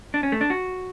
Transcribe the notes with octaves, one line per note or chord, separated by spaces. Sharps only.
D4
C#4
A3
D4
F#4